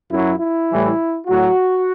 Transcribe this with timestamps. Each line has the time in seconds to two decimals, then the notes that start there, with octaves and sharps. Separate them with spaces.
0.11 F#2 F#3 E4
0.40 E4
0.69 A2 E3 G3
1.27 A2 F#3 F#4